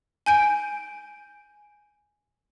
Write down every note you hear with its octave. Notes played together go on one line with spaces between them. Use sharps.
G#5 G6 D7